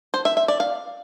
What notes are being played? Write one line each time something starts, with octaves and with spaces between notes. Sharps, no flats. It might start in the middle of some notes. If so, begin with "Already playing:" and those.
C5
E5
E5
D5
F5